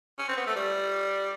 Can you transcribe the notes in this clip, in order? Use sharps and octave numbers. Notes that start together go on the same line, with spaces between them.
C#4
C4
B3
A3
G3